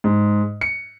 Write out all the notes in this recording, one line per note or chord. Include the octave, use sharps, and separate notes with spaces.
G#2
C#7